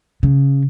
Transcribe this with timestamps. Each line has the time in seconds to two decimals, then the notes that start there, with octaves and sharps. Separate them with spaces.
0.23 C#3